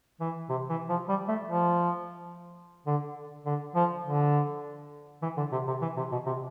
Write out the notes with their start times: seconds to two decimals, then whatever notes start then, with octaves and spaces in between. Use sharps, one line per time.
0.21 E3
0.50 C3
0.70 E3
0.89 F3
1.09 G3
1.29 A3
1.48 F3
2.87 D3
3.46 D3
3.75 F3
4.04 D3
5.23 E3
5.37 D3
5.52 C3
5.67 C3
5.82 E3
5.97 C3
6.12 B2
6.27 C3